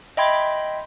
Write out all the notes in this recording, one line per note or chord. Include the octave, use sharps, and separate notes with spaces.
D#5 E5 G5 B5 C6 G#6